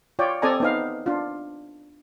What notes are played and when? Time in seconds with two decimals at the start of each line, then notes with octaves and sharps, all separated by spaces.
0.19 F4 C#5 D5 G5
0.42 C4 A4 D5 D#5 G#5 A#5
0.60 B3 D#4 F5
1.06 D4 F4